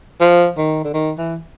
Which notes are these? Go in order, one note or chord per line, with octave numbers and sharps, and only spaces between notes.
F3
D#3
D3
D#3
E3